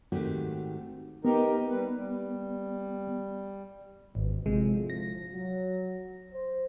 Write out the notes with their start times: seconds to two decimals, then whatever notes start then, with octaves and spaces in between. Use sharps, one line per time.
0.12 G#2 D#3 A3 C4 F#4 G4
1.25 B3 D#4 G4 A#4
1.70 G3 B4
1.94 G3
4.15 G#1 C#2 B2
4.46 D2 A2 C3 F3 G#3
4.90 A#6
5.32 F#3
6.33 C5